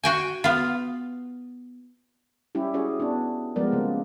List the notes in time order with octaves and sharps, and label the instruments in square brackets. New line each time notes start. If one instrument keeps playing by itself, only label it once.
[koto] F#4 G5 G#5
B3 F4
[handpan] G3 C#4 E4 G4
C#4 F#4 G#4 C#5
B3 D4
F3 G3 G#3 B3 A#4 D5
C#3 A#3